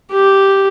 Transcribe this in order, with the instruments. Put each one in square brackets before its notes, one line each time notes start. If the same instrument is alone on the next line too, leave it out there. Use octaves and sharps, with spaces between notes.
[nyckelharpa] G4